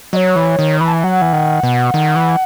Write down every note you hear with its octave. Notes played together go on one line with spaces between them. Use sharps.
F#3 C#5 D#5
E3
D#3
E3 B5
A5
G#5
F#3 F#5
E3
D#3
B2
D#3
E3